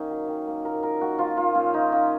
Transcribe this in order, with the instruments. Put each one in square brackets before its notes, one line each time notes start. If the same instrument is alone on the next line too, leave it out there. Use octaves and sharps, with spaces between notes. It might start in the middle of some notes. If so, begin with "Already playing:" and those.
Already playing: [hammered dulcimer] D#3 A#3 C#4 D#4
F#3
D#3
A#3
A#2 A#4
A#2 A#4
A#3 F#4
F3 F4
A#3 F4
A#2 C#4
F3 D#4
A#3 C#4